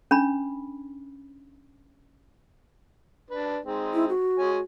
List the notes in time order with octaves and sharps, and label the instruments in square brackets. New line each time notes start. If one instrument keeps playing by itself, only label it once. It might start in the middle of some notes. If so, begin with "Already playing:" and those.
[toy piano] C#4 D4 B5
[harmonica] D4 B4
G#3 C4 D#4
[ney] E4
F#4
[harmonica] G#3 C#5 G#5